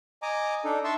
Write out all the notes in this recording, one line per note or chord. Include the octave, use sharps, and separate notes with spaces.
D#5 G#5 A#5 D6
D4 D#4 A4
E5 A5 C6 C#6 E6